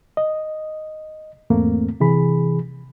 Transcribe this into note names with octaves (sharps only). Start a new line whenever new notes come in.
D#5
E2 G#2 A3 A#3 C4
C3 E3 G#4 B5